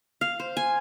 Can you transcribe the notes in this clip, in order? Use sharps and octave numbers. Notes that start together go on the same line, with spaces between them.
F5
C5
G#5